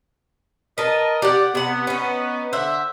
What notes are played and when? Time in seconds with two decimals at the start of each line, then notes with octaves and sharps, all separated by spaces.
0.78 A#4 B4 D#5 A5
1.22 G4 D5 F#5
1.55 C3 B3 F#5
1.87 C#4 D#4
2.53 D3 C5 E5 F#5